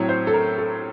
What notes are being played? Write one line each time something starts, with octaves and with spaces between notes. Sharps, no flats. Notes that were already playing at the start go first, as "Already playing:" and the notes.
Already playing: A2 F#3 C4 C#5
C5
A4
A#4
A4